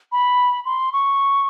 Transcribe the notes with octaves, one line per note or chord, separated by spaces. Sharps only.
B5
C6
C#6